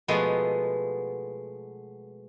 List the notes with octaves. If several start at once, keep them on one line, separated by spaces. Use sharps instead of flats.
B2 F3 G#3 A3 B3